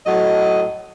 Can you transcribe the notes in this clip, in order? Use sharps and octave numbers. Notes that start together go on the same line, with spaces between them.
A2 F#3 D#5